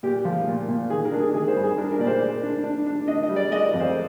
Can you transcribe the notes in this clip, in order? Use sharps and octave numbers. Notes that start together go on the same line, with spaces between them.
A#2 G4
F3
A#2
A#2
D#3 G#4
A#4
D4
G#4
D#3 G#4
C5
G2
G#4
D4 A#4
A#4
A#2 D5
C5
G#3
D4
D4
D4
D4 D#5
D#5
G3
D5
G#3 D#5
D5
F2
C5